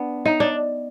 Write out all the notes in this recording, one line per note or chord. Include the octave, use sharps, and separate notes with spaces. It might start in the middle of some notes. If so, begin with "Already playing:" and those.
Already playing: B3 D4
D#4
D4